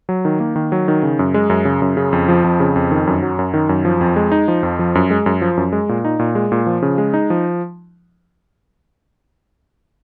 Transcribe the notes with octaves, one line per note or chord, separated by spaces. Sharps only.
F#3
D#3
A#3
D#3
F#3
D#3
C#3
F#2
G#3
F#2
C#3
F#2
C#3
F2
F3
F2
C#3
F2
D#3
F#2
F#3
F#2
D#3
F#2
F3
F2
G#3
D#4
F3
F2
F3
F#2
G#3
F#2
F3
F#2
G#3
A#2
D#4
A#2
G#3
A#2
F3
C#3
G#3
D#4
F3